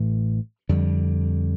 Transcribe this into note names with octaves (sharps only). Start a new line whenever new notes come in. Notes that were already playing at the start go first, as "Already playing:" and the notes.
Already playing: A1 A2 E3 A3
F2 D3 G3